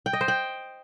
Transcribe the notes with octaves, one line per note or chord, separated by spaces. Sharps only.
G5
D#5
C5
G5